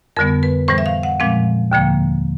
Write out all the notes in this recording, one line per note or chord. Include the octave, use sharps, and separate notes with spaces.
F2 D3 G3 B3 A#4
B4
A2 E3 G3 C5
E5
F5
F#5
A#2 F3 G#3 C4 F5
D#2 D3 F3 A#3